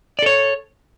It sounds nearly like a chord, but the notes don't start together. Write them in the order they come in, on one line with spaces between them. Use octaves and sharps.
D5 A4 C#5